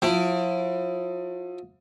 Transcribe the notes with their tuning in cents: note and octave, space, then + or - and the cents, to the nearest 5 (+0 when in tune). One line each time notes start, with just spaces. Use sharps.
F3 +40 E4 +25